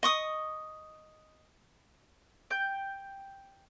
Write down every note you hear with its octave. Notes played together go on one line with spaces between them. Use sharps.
D#5 C#6 D#6
G5 G6